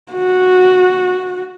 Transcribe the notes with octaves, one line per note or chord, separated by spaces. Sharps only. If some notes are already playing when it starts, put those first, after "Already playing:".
F#4